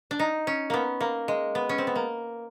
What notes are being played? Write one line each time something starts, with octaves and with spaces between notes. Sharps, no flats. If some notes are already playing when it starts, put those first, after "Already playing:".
D4
D#4
C#4
A#3 B3
A#3
G#3
B3
C#4
C4
B3
A#3